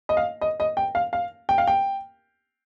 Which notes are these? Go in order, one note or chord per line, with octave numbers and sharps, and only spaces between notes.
D#5
F5
D#5
D#5
G5
F5
F5
G5
F5
G5